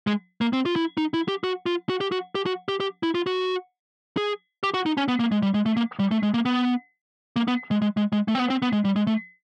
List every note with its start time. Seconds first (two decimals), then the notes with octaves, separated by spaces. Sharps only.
0.07 G#3
0.41 A#3
0.53 C4
0.65 F4
0.76 E4
0.98 D#4
1.14 E4
1.28 G4
1.44 F#4
1.66 F4
1.89 F#4
2.01 G4
2.12 F#4
2.35 G4
2.46 F#4
2.68 G4
2.80 G4
3.03 E4
3.15 F4
3.27 F#4
4.17 G#4
4.63 G4
4.74 F#4
4.86 D#4
4.97 C#4
5.08 B3
5.20 A#3
5.32 G#3
5.43 G3
5.54 G#3
5.66 A3
5.77 A#3
5.99 G3
6.11 A3
6.23 G#3
6.34 A#3
6.45 B3
7.36 A#3
7.48 B3
7.71 G#3
7.82 G#3
7.97 G#3
8.13 G#3
8.28 A3
8.35 C4
8.39 B3
8.50 C4
8.62 B3
8.73 G#3
8.85 G3
8.96 G#3
9.07 A3